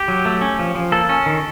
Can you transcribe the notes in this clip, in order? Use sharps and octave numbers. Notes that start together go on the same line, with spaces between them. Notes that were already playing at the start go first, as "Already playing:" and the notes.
Already playing: G4
F#3
A3
C#4
F3
F3
A#3 A4
C#4
D#3